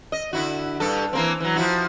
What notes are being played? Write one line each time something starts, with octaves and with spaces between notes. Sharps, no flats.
D#5
D3 E4 F#4
G2 A4
E3 A#3 C4
E3 F#3
F3 E4 F#4